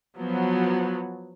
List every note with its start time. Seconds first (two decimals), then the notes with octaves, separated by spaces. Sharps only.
0.17 F3 F#3 B3